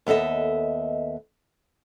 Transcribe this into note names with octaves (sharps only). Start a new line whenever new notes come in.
D#2 B3 A4 D#5 E5